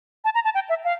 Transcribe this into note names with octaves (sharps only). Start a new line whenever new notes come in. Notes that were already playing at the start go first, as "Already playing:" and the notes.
A5
A#5
A5
G5
E5
F5